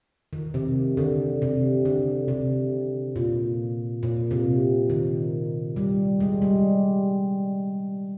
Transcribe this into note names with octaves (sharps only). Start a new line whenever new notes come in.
D#3
C3
D3
C3
D3
C3
A#2
A#2
C3
D#3
G3
G#3
G3